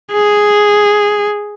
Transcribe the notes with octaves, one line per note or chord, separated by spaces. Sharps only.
G#4